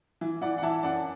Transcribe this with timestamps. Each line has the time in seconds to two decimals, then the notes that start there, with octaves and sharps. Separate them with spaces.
0.21 E3
0.41 E3 D5 F#5
0.58 F#5
0.63 E3 E5 A5
0.83 F#2 D5 F#5